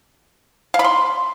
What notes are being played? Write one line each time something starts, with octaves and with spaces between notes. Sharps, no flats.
F5
B5
C6